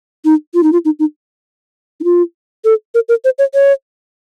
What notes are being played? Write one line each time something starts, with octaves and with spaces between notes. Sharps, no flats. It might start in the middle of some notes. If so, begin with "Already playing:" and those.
D#4
F4
D#4
F4
D#4
D#4
D#4
F4
A4
A#4
A#4
C5
C#5
C#5